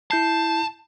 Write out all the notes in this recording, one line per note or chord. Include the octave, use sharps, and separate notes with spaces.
E4 A5 G6 C7